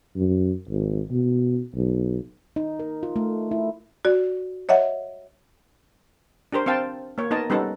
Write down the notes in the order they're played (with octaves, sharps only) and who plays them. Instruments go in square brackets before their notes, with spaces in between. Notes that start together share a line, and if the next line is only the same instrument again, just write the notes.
[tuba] F#2
G#1
B2
B1
[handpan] D#4
A#4
F4
A3
E4
[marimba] F#4 D5
C#5 D#5 E5 F#5
[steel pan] D4 G4 A#4 C5
C4 C5 F5 G5 A5
A#3 C#5
B3 D#4 A#4 D#5 A5
G3 B3 C#4 D#4 A4